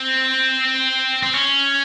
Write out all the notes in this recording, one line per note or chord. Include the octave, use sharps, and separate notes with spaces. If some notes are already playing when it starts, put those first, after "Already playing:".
Already playing: C4
C4
C#4